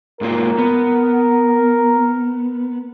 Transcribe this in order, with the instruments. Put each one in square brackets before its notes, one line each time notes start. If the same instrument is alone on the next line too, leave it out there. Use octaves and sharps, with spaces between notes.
[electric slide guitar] G#2 A#3 F4 [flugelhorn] A#4
[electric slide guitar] B3